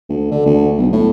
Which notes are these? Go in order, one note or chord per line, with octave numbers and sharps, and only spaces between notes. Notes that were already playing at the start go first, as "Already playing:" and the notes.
D2
D3
D2
B1
A2